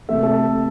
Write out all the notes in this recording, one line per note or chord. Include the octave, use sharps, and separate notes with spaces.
C3 E3 A3 E5
A4